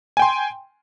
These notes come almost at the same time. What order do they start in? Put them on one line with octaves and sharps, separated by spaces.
G#5 G5 C6